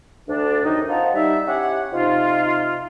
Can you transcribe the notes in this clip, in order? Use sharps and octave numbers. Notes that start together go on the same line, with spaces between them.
D2 D4
F#2 C3 D#3 D#4
C4 F4 D#5 F#5 A5 A#5
G3 D#4 E5
C#4 E4 G4 C#5 F#5
C3 D#4 F4